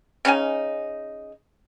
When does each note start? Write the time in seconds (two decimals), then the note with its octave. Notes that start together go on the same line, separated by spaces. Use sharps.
0.25 C#3 C#4 D#4 G#5